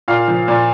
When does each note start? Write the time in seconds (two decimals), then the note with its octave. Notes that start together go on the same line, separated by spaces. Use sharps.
0.08 A#2 F5
0.28 F3
0.48 A#2